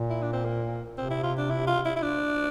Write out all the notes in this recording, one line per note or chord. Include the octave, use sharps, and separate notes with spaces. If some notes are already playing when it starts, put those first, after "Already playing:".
Already playing: A#2
E4
D4
C4
A#3
C3 C4
E4
F4
D4
E4
F4
E4
E4
D4